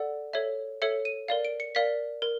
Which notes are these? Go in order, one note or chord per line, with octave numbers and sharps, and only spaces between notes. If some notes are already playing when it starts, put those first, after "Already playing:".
Already playing: A4 D5 F#5
A4 C#5 E5
A4 C#5 E5 C#7
D#7
A#4 D5 F5
D7
C#7
A#4 D5 F5 B6
A#4